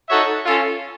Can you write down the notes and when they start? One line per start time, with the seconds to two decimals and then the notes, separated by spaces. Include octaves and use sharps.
0.09 D#4 F#4 A4 C#5 E5
0.46 C#4 F4 A4